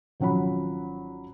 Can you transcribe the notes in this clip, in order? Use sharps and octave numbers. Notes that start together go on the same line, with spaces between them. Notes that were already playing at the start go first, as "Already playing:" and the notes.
G#1 F3 F#3 C#4 F#5 B5